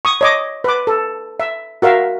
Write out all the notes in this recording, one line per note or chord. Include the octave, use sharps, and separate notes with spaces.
C#6 D#6
C#5 D#5 D6
B4 D6
A4
E5
F#4 A#4 E5 F5